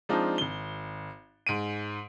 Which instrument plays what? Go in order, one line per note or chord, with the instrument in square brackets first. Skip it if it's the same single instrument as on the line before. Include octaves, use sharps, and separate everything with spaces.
[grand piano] F3 G#3 C4 D4 D#4 F4
G#1 G7
G#2 D7 D#7